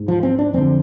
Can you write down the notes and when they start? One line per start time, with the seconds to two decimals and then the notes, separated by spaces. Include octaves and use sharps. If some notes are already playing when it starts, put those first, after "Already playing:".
Already playing: G#2
0.08 F3
0.23 C4
0.39 D4
0.53 F2 D3 C4